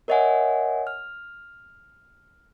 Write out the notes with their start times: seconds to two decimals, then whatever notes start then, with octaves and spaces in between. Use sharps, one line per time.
0.08 A#4 C#5 D#5 E5 F#5 G#5
0.87 F6